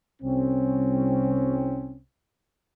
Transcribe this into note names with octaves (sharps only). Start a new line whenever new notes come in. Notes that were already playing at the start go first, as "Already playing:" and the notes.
C2 C4 C#4